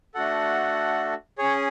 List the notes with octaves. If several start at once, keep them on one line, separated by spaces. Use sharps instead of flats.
A3 D4 F#4 A4 F#5
C#4 G#4 C#5